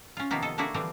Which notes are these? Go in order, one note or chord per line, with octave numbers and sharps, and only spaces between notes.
C#4 F4
C3 D#3 F3 A#3 B3
A4 D#5
A3 A#3 D4 E4 F#4 G#4
D3 E3 F3 G3 C4 D4